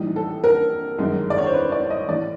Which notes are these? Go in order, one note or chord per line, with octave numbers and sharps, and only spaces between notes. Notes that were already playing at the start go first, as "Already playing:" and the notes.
Already playing: A#1 A2 E3 G3 D#4
A4
A#4
G1 F#2 D#3 G#3
D5
C#5
C5
B4
D5
D#5
A1 A2 E3 A3 D5